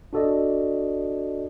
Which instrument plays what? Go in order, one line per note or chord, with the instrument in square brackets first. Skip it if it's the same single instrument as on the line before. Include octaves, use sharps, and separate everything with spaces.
[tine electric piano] D4 F#4 A4 D5 D#5